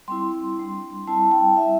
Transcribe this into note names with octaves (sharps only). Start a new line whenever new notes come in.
G3 C4 E4 C6
G3 D4
G3 C4 E4 A5
G5
G3 E4 E5